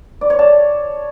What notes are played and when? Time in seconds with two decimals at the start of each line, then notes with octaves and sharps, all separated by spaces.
0.21 D5
0.30 C#5
0.39 A5